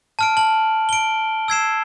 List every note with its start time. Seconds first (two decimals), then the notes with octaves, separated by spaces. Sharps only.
0.19 A5 F6 D7
0.37 A5 F#7
0.89 D7 G7
1.48 E6 G#6 C7 E7